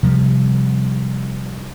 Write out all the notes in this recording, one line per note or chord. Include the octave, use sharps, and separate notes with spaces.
C3 F3 G3